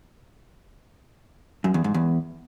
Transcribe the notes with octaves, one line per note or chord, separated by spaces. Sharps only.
F#2
E2
G#2
E2